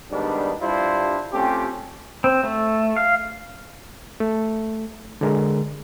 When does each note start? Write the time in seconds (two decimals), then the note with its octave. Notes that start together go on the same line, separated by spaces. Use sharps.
0.10 G#2 D#3 G3 B3 D4
0.61 G2 G3 D4 E4 F4 C5
1.33 A3 C4 C#4 F4 G4
2.24 C4
2.43 A3
2.96 F5
4.20 A3
5.21 D3 G#3 A#4